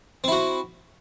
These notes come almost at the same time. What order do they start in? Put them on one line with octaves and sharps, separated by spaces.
C4 E4 F#4